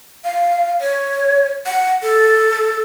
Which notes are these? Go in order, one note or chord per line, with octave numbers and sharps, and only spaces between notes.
F5
C#5
F#5
A4